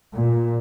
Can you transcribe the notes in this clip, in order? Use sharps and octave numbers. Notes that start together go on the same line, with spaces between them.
A#2